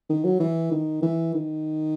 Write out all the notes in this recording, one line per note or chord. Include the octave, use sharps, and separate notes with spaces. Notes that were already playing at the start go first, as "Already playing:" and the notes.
D#3
F#3
E3
D#3
E3
D#3